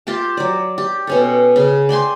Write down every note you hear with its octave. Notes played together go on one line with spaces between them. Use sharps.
F4 G4 G5 A5
F#3 D5
G4
B2 C#4 A4
C#3
D5 G5 G#5 C6